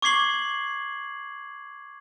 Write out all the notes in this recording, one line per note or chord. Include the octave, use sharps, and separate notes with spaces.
C#6 D6 G#6 C7 F#7